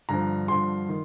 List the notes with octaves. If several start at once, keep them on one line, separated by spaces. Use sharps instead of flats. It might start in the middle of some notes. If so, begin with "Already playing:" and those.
G2 D3 F3 A#5
G2 D3 F3 C6
D#3